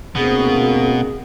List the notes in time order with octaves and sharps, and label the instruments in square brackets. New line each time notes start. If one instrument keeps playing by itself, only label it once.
[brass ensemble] D2 A#3 C4 [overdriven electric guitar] B2 [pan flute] G#4